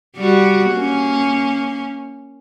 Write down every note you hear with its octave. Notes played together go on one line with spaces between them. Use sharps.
G3 F#4
A#3 C#4